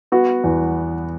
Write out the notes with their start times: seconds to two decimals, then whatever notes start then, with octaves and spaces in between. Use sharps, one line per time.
0.12 B3 F#4
0.44 E2